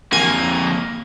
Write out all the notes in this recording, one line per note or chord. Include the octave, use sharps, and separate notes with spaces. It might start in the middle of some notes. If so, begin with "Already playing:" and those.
F2 A#3 G#5